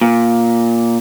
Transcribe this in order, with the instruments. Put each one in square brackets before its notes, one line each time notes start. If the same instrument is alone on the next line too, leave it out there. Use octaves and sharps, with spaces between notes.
[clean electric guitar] A#2